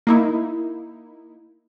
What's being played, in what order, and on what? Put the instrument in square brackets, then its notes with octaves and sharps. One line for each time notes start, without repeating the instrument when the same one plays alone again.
[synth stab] A#3 D#4 E4